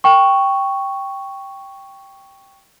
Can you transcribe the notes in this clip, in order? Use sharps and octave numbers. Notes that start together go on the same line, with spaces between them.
G5 C#6